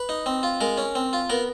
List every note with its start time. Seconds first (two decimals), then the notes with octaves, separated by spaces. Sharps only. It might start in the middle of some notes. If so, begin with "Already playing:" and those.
Already playing: B4
0.09 D#4
0.26 C4
0.43 F4
0.61 G#3 A#4
0.78 C#4
0.95 C4
1.13 F4
1.30 B3 A#4